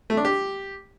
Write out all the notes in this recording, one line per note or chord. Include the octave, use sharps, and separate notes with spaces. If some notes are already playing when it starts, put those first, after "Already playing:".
A3
D4
G4